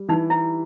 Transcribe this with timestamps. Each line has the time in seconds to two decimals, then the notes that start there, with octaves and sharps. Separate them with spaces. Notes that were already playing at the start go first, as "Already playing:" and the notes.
Already playing: G3
0.09 E3 D#4
0.30 E4